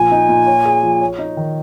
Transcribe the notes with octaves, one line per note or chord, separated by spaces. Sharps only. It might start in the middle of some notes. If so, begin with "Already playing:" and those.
Already playing: A#2 F3 G#5
D#4
A#2
C#5
G#4
F3
C#5
D#4
D#3